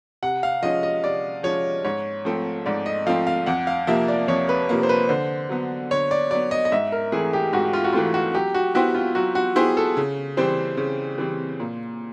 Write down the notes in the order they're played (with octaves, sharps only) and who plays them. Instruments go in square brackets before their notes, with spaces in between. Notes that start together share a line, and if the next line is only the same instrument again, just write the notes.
[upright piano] C3 [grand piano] F#5
[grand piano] F5
[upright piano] F3 G#3 C#4 [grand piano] D#5
[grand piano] D#5
[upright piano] C3 [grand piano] D5
[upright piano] F3 G#3 C#4 [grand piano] C#5
[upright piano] G#2 [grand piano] C#5
[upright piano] F3 A3 C4
[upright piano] G#2 [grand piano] D5
[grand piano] D#5
[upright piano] F3 A3 C4 [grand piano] F5
[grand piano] F5
[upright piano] F2 [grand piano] F#5
[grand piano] F5
[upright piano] C3 F3 A#3 [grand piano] E5
[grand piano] D5
[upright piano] F2 [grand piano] C#5
[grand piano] B4
[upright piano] C3 F3 A#3
[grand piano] C5
B4
[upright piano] D3 [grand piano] C5
[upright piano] F#3 B3
[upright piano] D3 [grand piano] C#5
[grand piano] D5
[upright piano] F#3 B3 [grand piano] D5
[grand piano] D#5
D#5
[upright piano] G#2 [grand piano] E5
[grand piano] A#4
[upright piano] E3 A3 C4 [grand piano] G#4
[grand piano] G4
[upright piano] G#2 [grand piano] F#4
[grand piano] F4
F#4
[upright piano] E3 A3 C4 [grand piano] F4
[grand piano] F#4
[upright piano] F#3 [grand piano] G4
[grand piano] F#4
[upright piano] B3 E4 G4 C5 [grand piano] F#4
[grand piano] F4
[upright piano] F#3 [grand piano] F#4
[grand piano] F#4
[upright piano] B3 E4 G4 C5 [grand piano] G#4
[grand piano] A4
[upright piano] C#3
[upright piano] E3 G3 C4 [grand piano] C5
[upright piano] C#3
E3 G3 C4
A#2